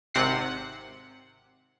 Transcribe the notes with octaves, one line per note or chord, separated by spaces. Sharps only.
G#1 C3 F#5 C7